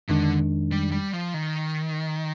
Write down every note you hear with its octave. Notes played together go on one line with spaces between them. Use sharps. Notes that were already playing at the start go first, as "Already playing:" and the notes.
F2 D3 D#3 G#3 D4
G3
G3
F3
D#3